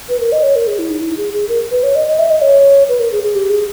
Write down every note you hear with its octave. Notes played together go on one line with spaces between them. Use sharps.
B4
A#4
D#5
C#5
A#4
G#4
E4
D#4
E4
G#4
G#4
A#4
B4
C#5
D#5
D#5
E5
D#5
C#5
B4
A#4
G#4
G#4
G4
G#4